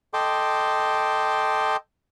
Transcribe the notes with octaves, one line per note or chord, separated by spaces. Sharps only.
A4 D#5 G5 C6 D6